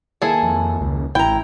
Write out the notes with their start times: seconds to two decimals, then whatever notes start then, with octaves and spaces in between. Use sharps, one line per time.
0.22 D#2 E4 G#4 A4
0.43 F2
0.81 C#2
1.15 A1 E4 G5 A#5